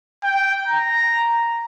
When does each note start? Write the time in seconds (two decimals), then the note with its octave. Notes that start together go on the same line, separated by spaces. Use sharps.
0.23 G5
0.67 A#5